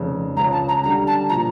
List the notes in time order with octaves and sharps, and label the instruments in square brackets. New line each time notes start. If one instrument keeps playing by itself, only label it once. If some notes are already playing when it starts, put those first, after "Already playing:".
Already playing: [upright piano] F1 F2 C#3
[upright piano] C#2 C#3 F3 C#4 [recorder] A#5
[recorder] A5
A#5
[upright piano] D2 D3 G3 [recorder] A#5
[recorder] A5
[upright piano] A#2 F3 [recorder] A#5